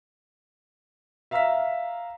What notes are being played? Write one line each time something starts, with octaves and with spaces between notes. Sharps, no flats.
E5 F5 A#5 E6 F6 B6